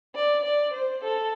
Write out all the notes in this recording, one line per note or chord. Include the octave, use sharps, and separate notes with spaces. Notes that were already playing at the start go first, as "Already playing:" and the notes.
D5
D5
C5
A4